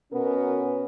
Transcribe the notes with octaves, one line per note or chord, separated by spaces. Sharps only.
B2 B3 C#4 A#4